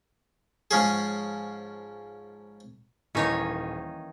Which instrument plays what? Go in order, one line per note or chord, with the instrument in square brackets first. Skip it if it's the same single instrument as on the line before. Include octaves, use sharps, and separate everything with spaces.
[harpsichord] G#2 F3 C#4 G#4
[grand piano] D#1 G#5 [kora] D#3 E3 A#3 [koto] C#4 D#4 C#5